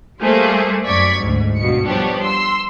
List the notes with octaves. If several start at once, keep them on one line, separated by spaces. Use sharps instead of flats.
G3 A3 A#3 G#4 C5
F#2 D5 C#6 G#6 B6
D2 G#2
G2 B2 C#7
F3 G3 B3 D4 G4 C#5
C6 E6